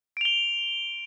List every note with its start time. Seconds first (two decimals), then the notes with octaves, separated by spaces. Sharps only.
0.17 D7
0.21 F7
0.25 G7